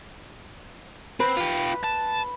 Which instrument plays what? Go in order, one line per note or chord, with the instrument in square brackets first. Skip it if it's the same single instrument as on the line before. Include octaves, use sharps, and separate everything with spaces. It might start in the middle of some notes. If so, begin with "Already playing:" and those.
[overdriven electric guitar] C4 [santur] B4
[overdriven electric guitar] F4 G4
A5